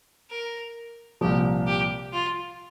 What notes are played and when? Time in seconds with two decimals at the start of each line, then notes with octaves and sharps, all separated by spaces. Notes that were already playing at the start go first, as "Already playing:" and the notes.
0.31 A#4
1.21 C2 A#2 F3 G4
1.67 G4
2.13 F4